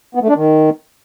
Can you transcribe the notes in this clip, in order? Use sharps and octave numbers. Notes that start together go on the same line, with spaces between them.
B3
A3
D4
D#3